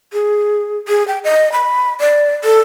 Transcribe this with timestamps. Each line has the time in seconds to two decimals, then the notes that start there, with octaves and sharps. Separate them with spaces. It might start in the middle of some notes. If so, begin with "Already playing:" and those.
0.13 G#4
0.88 G#4
1.08 G5
1.24 D#5
1.52 B5
2.00 D5
2.44 A4